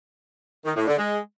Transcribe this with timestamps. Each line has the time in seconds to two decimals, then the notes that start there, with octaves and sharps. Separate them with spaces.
0.65 D#3
0.76 A2
0.87 D3
0.98 G#3